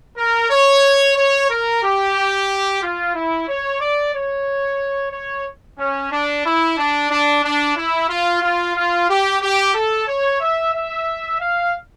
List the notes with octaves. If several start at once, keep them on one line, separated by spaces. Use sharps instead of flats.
A#4
C#5
C#5
A#4
G4
F4
E4
C#5
D5
C#5
C#5
C#4
D4
E4
D4
D4
D4
E4
F4
F4
F4
G4
G4
A4
C#5
E5
E5
F5